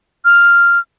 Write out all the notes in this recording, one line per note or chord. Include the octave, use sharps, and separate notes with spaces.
F6